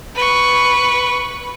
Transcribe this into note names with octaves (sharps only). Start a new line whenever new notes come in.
B4 C#6